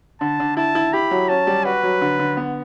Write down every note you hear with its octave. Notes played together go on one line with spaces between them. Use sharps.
D3 A5
D3
E4 A5
E4
G4 B5
F#3
C#4 A5
G3
F#4 B4
F#3
D3
D3
B3